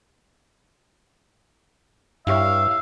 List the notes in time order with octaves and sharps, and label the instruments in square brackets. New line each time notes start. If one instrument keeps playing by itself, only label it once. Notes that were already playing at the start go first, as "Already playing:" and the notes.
[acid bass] G2 [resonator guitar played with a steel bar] E4 G4 C#5 [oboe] E5 [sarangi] F5